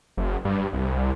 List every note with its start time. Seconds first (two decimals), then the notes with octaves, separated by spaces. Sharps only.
0.17 F#1
0.45 G2
0.73 C2